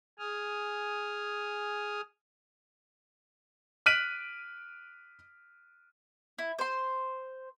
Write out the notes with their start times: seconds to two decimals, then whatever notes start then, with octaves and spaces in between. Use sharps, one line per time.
0.19 G#4 G#5 D#6 F6
3.86 F6 F#6 B6 D7 D#7 F#7
6.38 E4
6.59 C5 C6